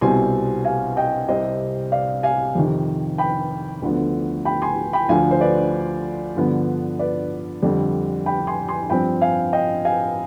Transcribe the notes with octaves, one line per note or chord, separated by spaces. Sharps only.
C2 B2 G3 C4 G#5 C6
F5 G#5
D#5 G5
C2 C3 G3 C4 C5 D#5
D5 F5
F5 G#5
F2 C3 D#3
G5 B5
D2 D3 F3 B3
G5 B5
G#5 C6
G5 B5
D2 D3 F3 F5 G#5
C5
B4 D5
G2 D3 F3 B3
B4 D5
F2 D3 G3
G5 B5
G#5 C6
G#5 C6
G2 F3 C4 G5 B5
F5 G#5
D#5 G5
F5 G#5